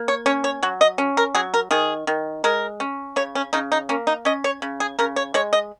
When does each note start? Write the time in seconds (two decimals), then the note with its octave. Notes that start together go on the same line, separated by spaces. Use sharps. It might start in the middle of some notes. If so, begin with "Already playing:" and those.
Already playing: A#3
0.08 C#5
0.26 C#4 C#5
0.44 C#5
0.63 F#3 F#4
0.81 D#5
0.98 C#4
1.17 A#4
1.35 F#3 G#4
1.54 A#4
1.71 D#3 G#4
2.07 D#3
2.44 G#3 A#4
2.80 C#4
3.16 C#3 C#5
3.35 C#4
3.53 C#3 D#4
3.72 D#4
3.89 A#3 C#4
4.07 D#4
4.25 C#4 D#5
4.44 C#5
4.62 C#3
4.80 G#4
4.99 C#3 A#4
5.16 C#5
5.34 G#3 C#5
5.53 D#5